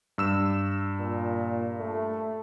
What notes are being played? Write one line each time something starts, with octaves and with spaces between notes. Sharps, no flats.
G2 E6 E7
A#2
A3